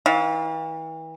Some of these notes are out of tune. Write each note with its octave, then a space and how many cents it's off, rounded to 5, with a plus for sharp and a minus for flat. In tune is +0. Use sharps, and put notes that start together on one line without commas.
E3 -35 F5 +30